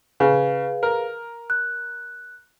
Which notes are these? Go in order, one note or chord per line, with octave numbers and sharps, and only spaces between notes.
C#3 G#4 B4 F5
A#4
F#6